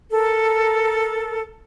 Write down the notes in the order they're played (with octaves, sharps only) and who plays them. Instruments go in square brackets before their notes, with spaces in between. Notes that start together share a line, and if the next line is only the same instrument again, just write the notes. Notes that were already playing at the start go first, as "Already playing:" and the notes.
[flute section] A4 A#4